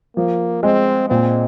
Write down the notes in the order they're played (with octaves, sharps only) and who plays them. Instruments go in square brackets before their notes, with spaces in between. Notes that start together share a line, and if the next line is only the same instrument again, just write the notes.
[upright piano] F3 [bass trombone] A#3
[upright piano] G#3 [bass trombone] C4
[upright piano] A#2 [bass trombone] C4